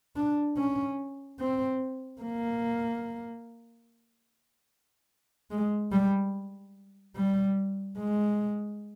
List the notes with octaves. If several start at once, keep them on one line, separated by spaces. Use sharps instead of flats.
D4
C#4
C4
A#3
G#3
G3
G3
G#3